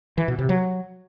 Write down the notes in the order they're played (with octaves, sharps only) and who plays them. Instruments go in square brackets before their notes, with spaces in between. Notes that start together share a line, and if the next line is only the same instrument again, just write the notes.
[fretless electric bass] E3
B2
C3
F#3